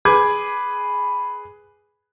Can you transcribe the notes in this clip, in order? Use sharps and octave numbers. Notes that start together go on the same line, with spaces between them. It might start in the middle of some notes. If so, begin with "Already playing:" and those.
G#4 B4 D6 G#6